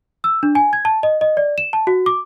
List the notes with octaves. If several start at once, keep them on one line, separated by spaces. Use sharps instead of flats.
E6
D4
G#5
G#6
A5
D#5
D#5
D5
E7
A5
F#4
D6